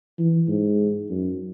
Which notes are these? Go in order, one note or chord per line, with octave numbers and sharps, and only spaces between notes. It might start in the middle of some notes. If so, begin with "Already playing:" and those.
E3
G#2
F#2